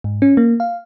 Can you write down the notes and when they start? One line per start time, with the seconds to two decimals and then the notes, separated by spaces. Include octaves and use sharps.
0.04 G#2
0.22 C#4
0.37 A#3
0.60 F5